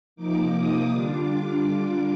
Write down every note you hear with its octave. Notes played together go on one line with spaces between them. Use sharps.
C3 F3 A#3 D#4 D6
D#6
D3 G3 D4 F4 D6